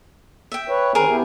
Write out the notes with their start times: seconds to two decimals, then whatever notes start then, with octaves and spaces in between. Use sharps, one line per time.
0.52 E5 G5
0.69 B4 C#5
0.95 D#3 C4 G#4 A#4
1.09 B3 E4 G4